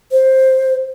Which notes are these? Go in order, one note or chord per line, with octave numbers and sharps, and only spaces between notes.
C5